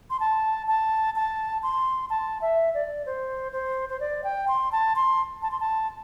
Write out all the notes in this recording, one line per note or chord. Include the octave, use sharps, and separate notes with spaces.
C6
A5
A5
A5
C6
A5
E5
D5
C5
C5
C5
D5
G5
C6
A5
C6
A5
C6
A5